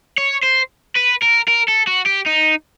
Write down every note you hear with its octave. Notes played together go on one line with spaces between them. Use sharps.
C#5
C5
B4
A#4
A#4
A4
F#4
G4
D#4